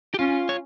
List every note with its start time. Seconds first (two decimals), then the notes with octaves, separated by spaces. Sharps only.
0.14 G4
0.19 C#4 F4
0.49 C#5